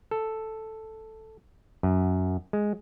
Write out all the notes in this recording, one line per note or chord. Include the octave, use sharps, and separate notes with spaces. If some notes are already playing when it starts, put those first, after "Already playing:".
A4
F#2
G#3